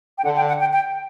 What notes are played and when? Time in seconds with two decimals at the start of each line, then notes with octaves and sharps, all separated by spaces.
0.18 G5
0.24 D3 F#5
0.36 G5
0.48 F#5
0.60 G5
0.72 G5